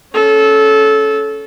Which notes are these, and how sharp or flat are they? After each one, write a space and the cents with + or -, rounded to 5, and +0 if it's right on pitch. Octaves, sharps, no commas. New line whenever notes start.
C#4 +5 A4 -20